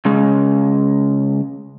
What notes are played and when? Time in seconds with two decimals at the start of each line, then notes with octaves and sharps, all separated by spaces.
0.05 C#3 G#3